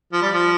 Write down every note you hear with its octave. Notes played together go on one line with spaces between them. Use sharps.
F3
G3
F3